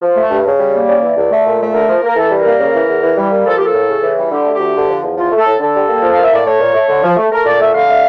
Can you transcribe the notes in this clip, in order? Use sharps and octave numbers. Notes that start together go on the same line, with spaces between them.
F3
A3
G2
C#3
G3
A#3
C#3 D5
E3
C#2
A3
A#2
A3
D3 A#4
F3
A#3 A#4
E3 A4
G3
A#4
A#3
C#3
E3
E2
E3
G3
A#3
F3 A4
A#3 G4
A4
A2
C#3
E3
G3
D3 G4
A3
G4
D2
D3
F3
E2
F3 F4
A3
A4
A2
D3 A4
G3
A#3
F3
F5
A#3
E5
A2 D5
A3 C#5
A#2
A3
D3
F3
A3
A3 A#4
A#2 D5
A3 E5
D3 F5
A3